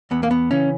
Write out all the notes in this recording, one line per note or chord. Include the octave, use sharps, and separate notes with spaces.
E2 B3
A#3
B3
C#3 E3 C#4